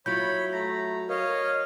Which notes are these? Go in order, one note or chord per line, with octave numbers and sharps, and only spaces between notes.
F#3 E4 F4 C#5 B5 G6
A3 A#5 A#6
A#4 C#5 D#5 F5